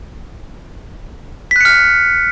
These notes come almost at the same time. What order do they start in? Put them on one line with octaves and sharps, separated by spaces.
B6 F#6 C#7 F6